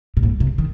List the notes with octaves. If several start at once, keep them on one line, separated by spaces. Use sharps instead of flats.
A#2
G#2
C3
D#3